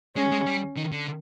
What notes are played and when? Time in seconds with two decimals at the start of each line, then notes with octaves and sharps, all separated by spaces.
0.16 G#3 C#4
0.32 G#3
0.47 G3
0.76 D#3
0.92 D3